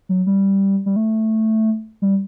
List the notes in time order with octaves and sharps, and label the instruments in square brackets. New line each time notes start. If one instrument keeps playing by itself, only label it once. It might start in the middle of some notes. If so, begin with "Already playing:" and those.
[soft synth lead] F#3
G3
G3
A3
G3